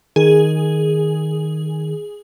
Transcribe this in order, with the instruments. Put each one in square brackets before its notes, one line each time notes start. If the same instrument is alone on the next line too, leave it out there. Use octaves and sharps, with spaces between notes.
[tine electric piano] D#3 [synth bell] G#4